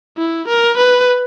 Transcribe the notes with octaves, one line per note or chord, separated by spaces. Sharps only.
E4
A#4
B4